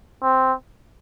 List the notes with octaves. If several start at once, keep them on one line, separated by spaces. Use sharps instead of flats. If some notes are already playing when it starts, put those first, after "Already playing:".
C4